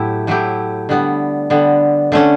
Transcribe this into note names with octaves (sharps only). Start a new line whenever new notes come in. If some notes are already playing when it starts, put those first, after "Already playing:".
Already playing: A2 F#3 A3 E4 G4
A2 F#3 A3 E4 G4
D3 G3 B3
D3 G3 B3
D3 A3 C#4